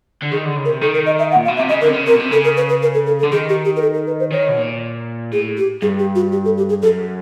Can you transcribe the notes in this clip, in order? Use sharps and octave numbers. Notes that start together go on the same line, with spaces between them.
D3
D#3 G#4
D3
C#3
A#4
C3
D#3 A4
A#4
D#5
E5
F#5
A#2
F5
B2
E5
C3
C#3 D#5
D3 A#4
C3
C#3
C3 A#4
B2
C3
C#3 A4
A#4
B4
B4
A#4
A4
A4
A4
D3
D#3 G#4
G4
G4
A#4
A4
A#4
B4
C5
D#3 C#5
B2
A#2
A2 G#4
G4
G2 G#4
G4
F#4
G4
A4
G4
G#4
F#2 A4